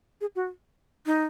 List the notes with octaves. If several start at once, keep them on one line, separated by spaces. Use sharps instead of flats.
G#4
F#4
D#4